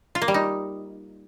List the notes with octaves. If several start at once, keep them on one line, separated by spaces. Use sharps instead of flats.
F4
A#3
G3
D#4